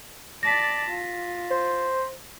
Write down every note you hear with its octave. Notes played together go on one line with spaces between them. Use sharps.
D5 A5 A#6 B6
F4
C5